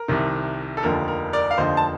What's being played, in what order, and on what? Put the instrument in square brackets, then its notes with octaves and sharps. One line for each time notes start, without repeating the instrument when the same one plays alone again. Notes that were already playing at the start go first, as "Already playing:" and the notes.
Already playing: [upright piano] A#4
C2 C3 D#3
A4
F1 D#2 D3 F3 A#4
A#4
A#4 D5
F5
F1 D#2 D3 F3 C5 D#5
A5